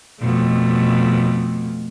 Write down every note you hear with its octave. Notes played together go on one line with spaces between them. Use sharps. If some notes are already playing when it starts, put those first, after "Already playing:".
F2 B2 A3